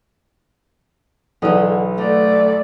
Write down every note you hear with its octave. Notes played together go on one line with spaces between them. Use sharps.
B1 D3 E3 G#3 D#6
D3 A3 D5